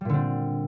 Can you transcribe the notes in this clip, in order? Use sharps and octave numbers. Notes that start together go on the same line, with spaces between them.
A#2 D3 G3 C4